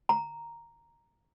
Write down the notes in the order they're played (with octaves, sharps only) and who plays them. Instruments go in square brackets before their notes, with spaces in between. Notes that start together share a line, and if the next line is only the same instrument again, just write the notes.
[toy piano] A#5